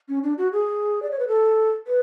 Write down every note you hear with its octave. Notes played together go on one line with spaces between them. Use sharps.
C#4
D4
F#4
G#4
D5
C#5
B4
A4
B4